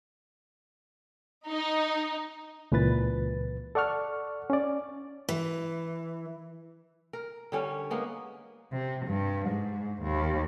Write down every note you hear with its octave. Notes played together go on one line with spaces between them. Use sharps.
D#4
C#2 A#2 E3 B4 A6
A4 D5 F#5 C#6 F6
C#4 D5
E3
A#4
D3 G3 C#4
G#3 A#3 B3
C3
G2
G#2
D#2